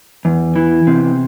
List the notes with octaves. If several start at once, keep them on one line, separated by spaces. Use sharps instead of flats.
E2
E3
C3